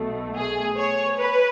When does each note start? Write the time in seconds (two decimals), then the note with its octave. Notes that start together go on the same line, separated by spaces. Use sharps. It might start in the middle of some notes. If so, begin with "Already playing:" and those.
Already playing: B1 B2 A3
0.36 G#4
0.77 C#5
1.18 B4